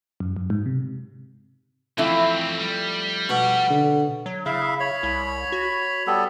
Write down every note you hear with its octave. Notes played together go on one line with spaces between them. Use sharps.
F#2
F#2
G#2
C3
F2 E3 A3 C4 E4
G3
B2
D3
F#3
C#3 E4 E5 F5
C#5 B5
C2
F#4
G3 B3 A4